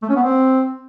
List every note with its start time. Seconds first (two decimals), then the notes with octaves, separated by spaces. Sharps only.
0.02 A3
0.09 C#4
0.16 B3
0.23 C4